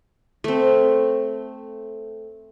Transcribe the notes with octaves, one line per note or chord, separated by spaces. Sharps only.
A3 C4